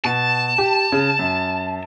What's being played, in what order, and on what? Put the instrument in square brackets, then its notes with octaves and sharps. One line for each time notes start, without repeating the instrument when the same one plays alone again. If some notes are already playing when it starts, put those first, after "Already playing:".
[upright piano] B2 [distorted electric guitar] A5
[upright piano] G4
C#3
F#2